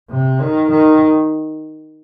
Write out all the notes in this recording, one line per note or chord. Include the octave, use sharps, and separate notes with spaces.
C3
D#3
D#3